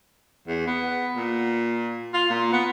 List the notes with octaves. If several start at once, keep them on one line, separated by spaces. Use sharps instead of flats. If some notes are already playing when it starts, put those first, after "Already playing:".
E2
B3
A#2
F4
A#2
B3